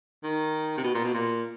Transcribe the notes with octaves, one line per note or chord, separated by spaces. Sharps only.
D#3
C3
B2
A#2
B2
A#2